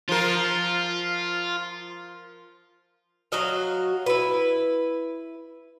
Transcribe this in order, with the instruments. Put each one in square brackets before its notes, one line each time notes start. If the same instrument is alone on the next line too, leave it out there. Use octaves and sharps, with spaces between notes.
[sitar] F3 A#4 [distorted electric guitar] F4
[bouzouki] F#3 F#4 D#5 F5
E4 B4